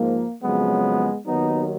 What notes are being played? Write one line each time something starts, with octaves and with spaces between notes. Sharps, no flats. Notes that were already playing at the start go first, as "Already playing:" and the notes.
Already playing: G#2 F3 A#3
F2 C#3 F#3 G#3 B3
D#2 D#3 F#3 B3 D#4